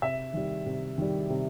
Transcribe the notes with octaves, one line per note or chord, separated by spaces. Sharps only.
C3 E5
D#3 G3
C3
D#3 G3
C3